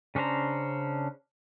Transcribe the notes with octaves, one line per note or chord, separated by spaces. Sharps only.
C#3 C#4 D4 C5 A#5